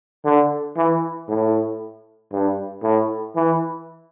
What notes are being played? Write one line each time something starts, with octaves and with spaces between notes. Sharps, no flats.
D3
E3
A2
G2
A2
E3